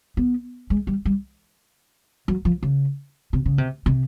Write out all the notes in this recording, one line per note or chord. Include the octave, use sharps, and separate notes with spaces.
B3
G#3
G3
G3
F#3
F3
C#3
C3
C#3
C3
C3